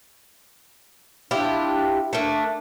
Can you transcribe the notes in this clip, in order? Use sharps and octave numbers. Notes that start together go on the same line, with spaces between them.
D4 E4 F4 G4
A3 A#3 D4